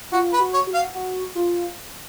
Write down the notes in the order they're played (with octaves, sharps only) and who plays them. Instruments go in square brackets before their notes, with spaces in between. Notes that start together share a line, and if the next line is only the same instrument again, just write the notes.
[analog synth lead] F4 [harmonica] F#4
[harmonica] B4
[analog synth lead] F#4
[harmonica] C#5
[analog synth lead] F#4
[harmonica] F5
[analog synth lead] F#4
F4